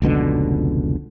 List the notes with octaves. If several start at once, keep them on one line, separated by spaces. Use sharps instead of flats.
F1 C#2 B2 D3